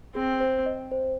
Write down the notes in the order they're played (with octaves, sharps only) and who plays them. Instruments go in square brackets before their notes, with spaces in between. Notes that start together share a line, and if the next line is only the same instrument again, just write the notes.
[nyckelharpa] C4 [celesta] G#4
[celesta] C5
D#5
C5